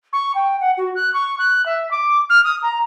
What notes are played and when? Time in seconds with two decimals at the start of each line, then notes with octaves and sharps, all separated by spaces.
0.13 C#6
0.35 G5
0.61 F#5
0.78 F#4
0.96 F#6
1.14 C#6
1.39 F#6
1.66 E5
1.91 D6
2.30 F6
2.44 D#6
2.63 A#5